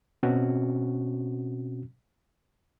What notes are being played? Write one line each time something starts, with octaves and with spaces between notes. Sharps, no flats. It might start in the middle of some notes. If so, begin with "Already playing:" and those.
B2 C4 C#4 F#4